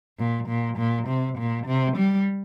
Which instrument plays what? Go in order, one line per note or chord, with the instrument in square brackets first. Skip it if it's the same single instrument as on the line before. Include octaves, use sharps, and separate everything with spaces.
[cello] A#2
A#2
A#2
C3
A#2
C3
G3